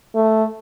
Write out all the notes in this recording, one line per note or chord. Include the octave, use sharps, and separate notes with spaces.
A3